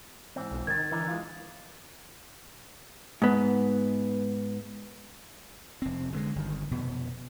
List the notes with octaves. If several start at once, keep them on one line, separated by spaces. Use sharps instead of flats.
G#2 E3 C4
B1
D#3 G#6 A6
D3 E3 D#4 A#4
G#3 F4
G#2 B3
F1 C4
D3 F#3 G#3
G1 D#3
F1 B2 B3